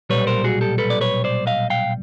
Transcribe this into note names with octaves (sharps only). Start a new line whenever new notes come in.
B1 A#2 G3 B4 C#5
A#4 C5
F#4 G#4
G4 A4
A4 B4
D5
B4 C#5
C5 D5
D#5 F5
F5 G5